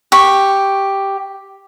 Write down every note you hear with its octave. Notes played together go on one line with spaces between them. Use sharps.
G4 C#6